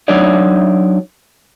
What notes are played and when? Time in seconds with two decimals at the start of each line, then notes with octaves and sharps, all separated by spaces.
0.08 F#3 D4 D#4 C#5 D5